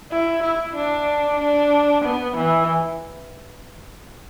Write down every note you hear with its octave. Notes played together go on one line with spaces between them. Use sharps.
E4
E4
D4
D4
B3
E3